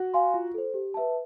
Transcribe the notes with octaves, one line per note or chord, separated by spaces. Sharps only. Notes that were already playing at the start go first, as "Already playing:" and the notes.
Already playing: F#4
F5 G#5 C6
F4
A4 C5
G4
B4 E5 A5